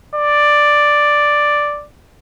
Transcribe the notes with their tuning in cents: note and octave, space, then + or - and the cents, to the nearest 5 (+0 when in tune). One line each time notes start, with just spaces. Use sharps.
D5 +5